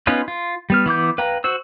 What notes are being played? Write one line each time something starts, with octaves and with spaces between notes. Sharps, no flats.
B3 C#4 D#4 F4 B4
F4
G3 B3 F6
E3 B3 D6 G6
B4 F5 G5 A#5
F#4 C5 E6